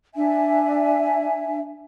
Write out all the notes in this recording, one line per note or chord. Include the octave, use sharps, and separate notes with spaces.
D4 E5 G#5